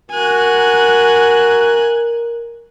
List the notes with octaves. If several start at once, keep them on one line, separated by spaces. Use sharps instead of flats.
F#4 A#4 G#5 F#6